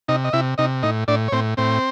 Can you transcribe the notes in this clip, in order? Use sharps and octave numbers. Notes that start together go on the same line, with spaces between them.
C3 D#4 D#5
D#5
C3 E4 E5
C3 D#4 D#5
A2 D#4 D#5
A2 D4 D5
C#5
A2 C4 C5
A2 C4 C5